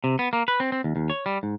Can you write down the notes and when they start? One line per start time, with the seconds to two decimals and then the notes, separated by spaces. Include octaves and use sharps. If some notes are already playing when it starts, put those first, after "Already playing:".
0.04 C3
0.19 B3
0.33 A#3
0.48 B4
0.60 C4
0.72 C4
0.84 D#2
0.96 D#2
1.10 C#5
1.26 G3
1.43 G#2